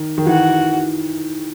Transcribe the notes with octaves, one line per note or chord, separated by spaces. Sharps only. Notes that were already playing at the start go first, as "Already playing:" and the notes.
Already playing: D#3
D#3
E3 F#4